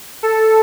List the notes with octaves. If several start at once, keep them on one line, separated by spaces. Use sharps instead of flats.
A4